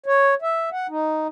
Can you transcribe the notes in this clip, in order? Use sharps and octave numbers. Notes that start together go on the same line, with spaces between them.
C#5
E5
F#5
D#4